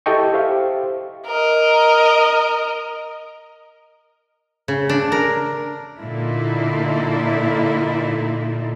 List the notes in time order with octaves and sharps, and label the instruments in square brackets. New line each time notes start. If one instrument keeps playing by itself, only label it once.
[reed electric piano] E4 G4 A4 D#5 G5 C#6
G4 C5 E5 F5
[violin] A#4 D#5
[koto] C#3
D4
A#4
[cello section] A#2 D3 A#3 D#4 E4 A4